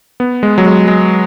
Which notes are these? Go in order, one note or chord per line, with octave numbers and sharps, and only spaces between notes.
B3
G#3
F#3
G#3
G#3